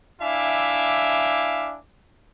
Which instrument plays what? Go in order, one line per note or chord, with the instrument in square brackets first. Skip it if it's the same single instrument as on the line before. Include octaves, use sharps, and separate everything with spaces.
[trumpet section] D4 E4 E5 F5 G#5 D6